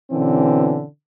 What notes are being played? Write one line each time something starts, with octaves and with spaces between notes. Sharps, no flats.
B2 D3 E3 C4 C#4